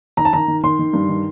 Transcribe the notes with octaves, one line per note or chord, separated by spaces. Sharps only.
D#3 A#5
A5
D#3 A#5
D#3
D#3 C6
D#3
G2
D#3